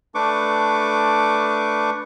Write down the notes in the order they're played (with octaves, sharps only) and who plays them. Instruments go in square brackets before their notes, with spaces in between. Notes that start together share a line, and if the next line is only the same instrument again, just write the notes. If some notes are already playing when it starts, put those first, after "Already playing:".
[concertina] A3 D4 B4 C#6 D6